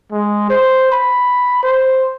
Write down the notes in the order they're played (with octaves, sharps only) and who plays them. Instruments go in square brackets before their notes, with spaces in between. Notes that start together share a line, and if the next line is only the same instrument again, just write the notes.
[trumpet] G#3
C5
B5
C5